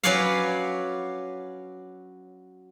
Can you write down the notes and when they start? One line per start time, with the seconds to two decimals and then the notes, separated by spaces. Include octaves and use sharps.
0.03 F#3 C#4 B4 C#5 D5 F5